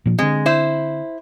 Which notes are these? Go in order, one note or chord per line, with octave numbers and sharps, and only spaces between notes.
A#2 F3
D3 G#3 C4
E4 C5